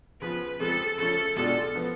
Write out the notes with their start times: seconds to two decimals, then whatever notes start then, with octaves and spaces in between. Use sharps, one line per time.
0.21 C#3 F3 B3 F4 B4
0.60 F2 C#3 F3 G#3 A4
0.98 C#3 F3 A3 C#4 A4
1.36 C#2 B2 G#3 D4 F4 A4
1.75 F3 B3